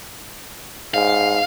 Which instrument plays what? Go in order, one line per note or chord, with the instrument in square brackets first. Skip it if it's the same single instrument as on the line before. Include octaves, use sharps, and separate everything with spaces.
[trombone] G#2 [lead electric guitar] F5